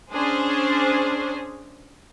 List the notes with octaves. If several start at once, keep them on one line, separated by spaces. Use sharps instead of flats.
C#4 D4 G#4 C5